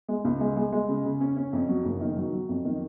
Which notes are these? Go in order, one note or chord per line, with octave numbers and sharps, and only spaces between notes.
G#3
C#2
G#3
G#3
G#3
C#3
C#3
C#4
C#4
F2
F#3
F#1
D#3
F#3
F#3
F2
D#3